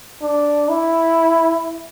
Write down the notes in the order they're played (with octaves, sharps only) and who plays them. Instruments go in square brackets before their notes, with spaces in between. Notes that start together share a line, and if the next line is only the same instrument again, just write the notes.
[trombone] D4
E4